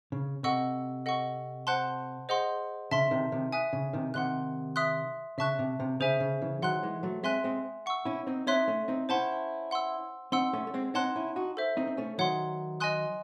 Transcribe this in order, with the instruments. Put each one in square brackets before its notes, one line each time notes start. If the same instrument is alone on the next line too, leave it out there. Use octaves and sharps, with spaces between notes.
[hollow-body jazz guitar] C#3
[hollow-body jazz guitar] C3 [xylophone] A4 D#5 F#5 C#6 E6
[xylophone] A4 D#5 F#5 C#6
C5 F#5 A5 C6 F#6
G#4 C5 D#5 F#5 C6
[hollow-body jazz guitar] C#3 [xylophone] E5 A5 C6
[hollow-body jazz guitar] C3 D#3
C3 D#3
[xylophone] E5 G#5 D#6 F#6
[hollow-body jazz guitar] C#3
C3 D#3
[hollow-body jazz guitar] C3 D#3 [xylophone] F#5 C6 F#6
[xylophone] E5 C6 D#6 F#6
[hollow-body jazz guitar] C#3 [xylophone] E5 A5 C#6 F#6
[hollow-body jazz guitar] C3
C3
[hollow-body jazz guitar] C#3 [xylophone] G#4 C5 E5 G#5
[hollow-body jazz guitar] C#3
C#3 E3
[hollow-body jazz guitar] D#3 F#3 [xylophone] F#5 C6 F#6
[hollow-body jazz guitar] E3 G#3
F#3 A3
[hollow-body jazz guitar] G#3 C4 [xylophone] E5 G#5 C6 F#6
[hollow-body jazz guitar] G#3 C4
[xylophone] F#5 C#6 E6
[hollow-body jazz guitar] C#4 E4
C4 D#4
[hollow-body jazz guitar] C4 D#4 [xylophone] C#5 E5 C6 F#6
[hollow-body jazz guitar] A3 C#4
C4 D#4
[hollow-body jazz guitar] C#4 E4 [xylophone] C5 F#5 A5 C6
[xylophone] F#5 C6 E6
[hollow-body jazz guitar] C4 D#4 [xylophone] F#5 C6 E6
[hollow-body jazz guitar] A3 C#4
A3
G#3 C4
[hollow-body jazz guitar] C4 D#4 [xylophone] C#5 F#5 A5 C6 F#6
[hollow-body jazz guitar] C#4 E4
D#4 F#4
[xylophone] A4 C5 E5
[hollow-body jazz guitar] C4 D#4
C4
A3 C#4
[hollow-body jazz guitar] D#3 F#3 [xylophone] C#5 F#5 C6
[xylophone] D#5 G#5 C6 D#6 F#6